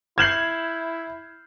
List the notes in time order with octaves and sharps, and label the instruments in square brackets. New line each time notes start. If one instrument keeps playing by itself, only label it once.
[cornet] E4 [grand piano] F6 G6 C7 [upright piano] G#6 E7 F#7